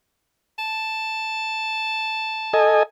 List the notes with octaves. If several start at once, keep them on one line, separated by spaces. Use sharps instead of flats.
A5
A4 D#5 G#5